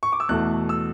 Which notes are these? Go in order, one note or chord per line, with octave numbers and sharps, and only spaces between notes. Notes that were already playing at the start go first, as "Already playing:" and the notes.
C#6
D6
E6
E2 B2 A3 F#6
E6